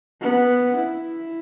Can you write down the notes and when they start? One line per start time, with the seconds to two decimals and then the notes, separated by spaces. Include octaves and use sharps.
0.21 B3
0.77 E4